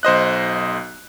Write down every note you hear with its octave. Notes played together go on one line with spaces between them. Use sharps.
B1 C5 D#5 F#6